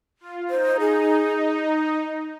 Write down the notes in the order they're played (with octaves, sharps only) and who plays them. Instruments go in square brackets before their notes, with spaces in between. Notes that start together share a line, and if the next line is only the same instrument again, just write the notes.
[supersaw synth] F4
[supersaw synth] D#4 [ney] C5
[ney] G#4